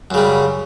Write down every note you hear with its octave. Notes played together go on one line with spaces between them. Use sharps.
F#2 C#3 G3